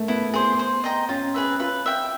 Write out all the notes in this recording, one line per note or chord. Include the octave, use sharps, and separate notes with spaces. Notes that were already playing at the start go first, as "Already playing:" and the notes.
Already playing: A3 A#3
B3 E4
G#4 C5
C5
D#5 G5 A#5
C#4 F4
G#4 B4 E5
F4 B4
E5 G5